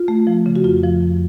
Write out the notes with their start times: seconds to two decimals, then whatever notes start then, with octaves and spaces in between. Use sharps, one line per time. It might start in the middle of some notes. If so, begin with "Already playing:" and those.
Already playing: F4
0.08 A3
0.27 F3
0.46 C#3
0.56 F#4
0.64 F2 F4
0.84 F3
1.01 F2